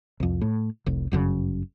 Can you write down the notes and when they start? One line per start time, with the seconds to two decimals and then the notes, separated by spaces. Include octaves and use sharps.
0.20 C2 F2
0.42 A2
0.86 F1 C2
1.12 G1 F#2 A#2 C#3